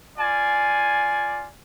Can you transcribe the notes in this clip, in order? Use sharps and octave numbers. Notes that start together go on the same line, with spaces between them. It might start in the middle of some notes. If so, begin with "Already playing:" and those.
F4 D5 G#5